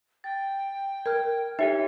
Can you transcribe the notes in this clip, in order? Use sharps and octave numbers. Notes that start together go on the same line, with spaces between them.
G5 A6
A#4 F6 G#6
D#4 G4 A4 C#5 E5